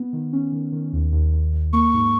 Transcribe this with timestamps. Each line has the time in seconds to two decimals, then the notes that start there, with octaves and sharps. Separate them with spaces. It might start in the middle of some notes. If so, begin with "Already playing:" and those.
Already playing: B3
0.13 D#3
0.33 C#4
0.52 D#3
0.72 D#3
0.93 D#2
1.12 D#2
1.33 D#2
1.54 D#2
1.73 A#3 C#6
1.93 G#2